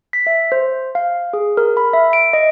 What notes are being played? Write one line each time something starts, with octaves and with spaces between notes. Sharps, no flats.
B6
E5
C5
F5
G#4
A#4
B5
E5
D7
D#5